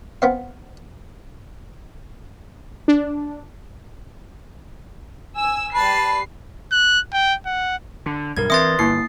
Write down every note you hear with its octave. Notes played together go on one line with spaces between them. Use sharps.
B3 C4 F5
D4
G#5 E6
G3 B4 A5 C7
F#6
G5
F#5
D3 D4
B1 G2 A#4 G#6
E3 C4 B4 E5 C6 D#6 A6 A#6
G1 A#3 E4 C7